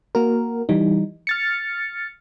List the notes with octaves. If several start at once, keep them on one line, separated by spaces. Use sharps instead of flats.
A#3 F#4 A#4
E3 G3 D#4
F6 A6 C#7